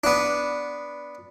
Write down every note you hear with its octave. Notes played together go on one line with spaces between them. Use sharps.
B3 D4